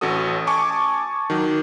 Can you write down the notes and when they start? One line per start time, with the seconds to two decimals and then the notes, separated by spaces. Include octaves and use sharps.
0.01 A1 C#4 F#4 A4 D#6
0.47 G#5 A5 C#6 D6
1.30 D#3 F#3